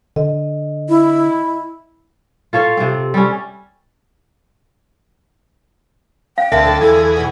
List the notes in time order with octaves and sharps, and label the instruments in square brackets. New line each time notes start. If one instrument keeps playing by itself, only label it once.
[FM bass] D3 [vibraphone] D#5
[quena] E4
[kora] F4 A4 C#5 F5
C3 C4
G3 C#4
[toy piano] F5 [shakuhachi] G5
[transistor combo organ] D2 A5 [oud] A#3 C4 D4 [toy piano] E5
[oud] F#2 D3
[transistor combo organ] E2 G#4 [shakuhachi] A4
[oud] B2 E3 [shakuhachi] F#5